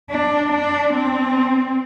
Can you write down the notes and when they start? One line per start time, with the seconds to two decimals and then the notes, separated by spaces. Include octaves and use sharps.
0.10 D4
0.52 D4
0.94 C4